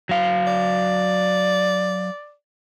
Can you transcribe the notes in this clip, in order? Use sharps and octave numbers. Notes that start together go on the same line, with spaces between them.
F#3 F5
D5